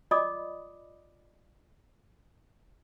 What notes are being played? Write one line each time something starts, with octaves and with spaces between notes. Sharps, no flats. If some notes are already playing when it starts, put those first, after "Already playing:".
F4 D5 D#5 B5 D6 D#6